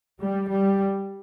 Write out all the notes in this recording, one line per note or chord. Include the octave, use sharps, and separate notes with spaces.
G3
G3